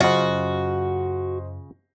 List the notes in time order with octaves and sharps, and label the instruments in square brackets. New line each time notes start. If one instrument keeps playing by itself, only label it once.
[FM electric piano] F#2 [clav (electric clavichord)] C#3 F4 [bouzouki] F#4 [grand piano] C5 D#5